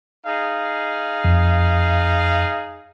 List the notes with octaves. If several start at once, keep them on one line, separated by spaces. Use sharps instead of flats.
D#4 G#4 F5
F2